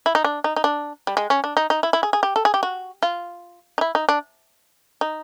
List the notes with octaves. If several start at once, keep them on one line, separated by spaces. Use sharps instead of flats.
E4
D#4
D4
D#4
D#4
D4
G3
G#3
C#4
D4
D#4
D#4
E4
E4
G#4
G#4
G4
A4
G#4
G4
F#4
F4
D#4
E4
D#4
D4
D#4